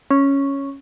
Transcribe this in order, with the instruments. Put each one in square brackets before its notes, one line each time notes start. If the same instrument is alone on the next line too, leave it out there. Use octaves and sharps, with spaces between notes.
[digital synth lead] C#4